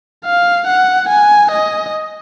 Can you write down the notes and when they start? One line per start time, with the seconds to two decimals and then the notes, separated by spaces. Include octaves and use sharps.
0.25 F5
0.67 F#5
1.09 G#5
1.51 D#5